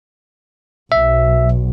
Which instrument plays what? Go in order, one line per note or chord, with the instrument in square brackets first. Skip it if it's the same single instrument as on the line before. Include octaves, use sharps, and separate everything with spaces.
[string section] B1 [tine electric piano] E5